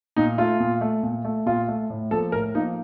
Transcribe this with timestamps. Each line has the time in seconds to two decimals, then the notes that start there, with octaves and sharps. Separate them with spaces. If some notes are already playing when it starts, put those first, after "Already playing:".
0.16 A#2 D#4
0.38 A3 F4
0.60 A#2
0.81 A3
1.03 A#2
1.25 A3
1.46 A#2 F4
1.68 A3
1.90 A2
2.11 F3 A#3 A4
2.32 A2 A#4
2.54 F3 A#3 D#4